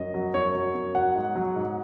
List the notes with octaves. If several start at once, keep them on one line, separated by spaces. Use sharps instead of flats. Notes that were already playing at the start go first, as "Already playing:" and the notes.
Already playing: F#2 D#5
F#3
F#2 C#5
F#3
F#2
F#3 F#5
G#2
F#3
G#2